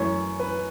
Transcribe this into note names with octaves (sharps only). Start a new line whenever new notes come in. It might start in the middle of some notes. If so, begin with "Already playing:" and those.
Already playing: F#2 E3 A3 C#4 C#5
B4